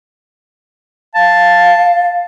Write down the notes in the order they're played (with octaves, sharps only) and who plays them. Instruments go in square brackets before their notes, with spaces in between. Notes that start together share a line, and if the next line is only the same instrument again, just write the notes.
[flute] F5 [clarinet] A5